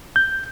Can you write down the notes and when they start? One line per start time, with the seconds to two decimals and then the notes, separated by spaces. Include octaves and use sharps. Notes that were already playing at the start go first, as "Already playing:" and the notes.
0.16 G6